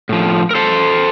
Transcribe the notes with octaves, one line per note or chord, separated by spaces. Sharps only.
A2 F3
A#4
A4 C5